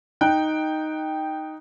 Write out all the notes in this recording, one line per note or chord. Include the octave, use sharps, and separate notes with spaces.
D#4 G5 F#6